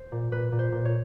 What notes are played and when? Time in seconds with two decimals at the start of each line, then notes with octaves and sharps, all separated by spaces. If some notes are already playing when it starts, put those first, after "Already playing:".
Already playing: C5
0.12 A#2
0.32 A#2 B4
0.52 A#2
0.59 C5
0.72 A#2
0.85 C#5